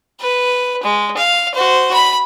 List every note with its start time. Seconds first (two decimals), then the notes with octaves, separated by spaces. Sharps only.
0.20 B4
0.83 G#3
1.17 F5
1.55 F#4 C5
1.94 B5